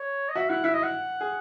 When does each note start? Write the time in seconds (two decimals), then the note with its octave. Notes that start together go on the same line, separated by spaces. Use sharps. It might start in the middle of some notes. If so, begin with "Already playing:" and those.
Already playing: C#5
0.29 D#5
0.35 F#4 E5
0.49 E4 F#5
0.64 E4 E5
0.73 D#5
0.83 F#5
1.21 G#4